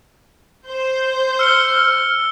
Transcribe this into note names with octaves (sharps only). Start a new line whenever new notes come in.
C5 G6
E6 F6 C#7 G7